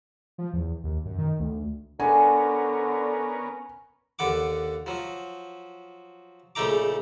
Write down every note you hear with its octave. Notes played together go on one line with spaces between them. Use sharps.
F3
E2
D#2
F#2
D#3
D2
D3 B3 C#4 A#4 G#5
D#2 D3 F#5 D6
F3 F#3
A#1 C#3 A3 D#4 A#5 D6